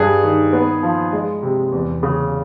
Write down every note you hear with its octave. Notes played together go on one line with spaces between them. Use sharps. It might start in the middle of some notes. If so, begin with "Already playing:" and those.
Already playing: G2 G#4
D#3
B3
F3
G#3
C3
E2
C#3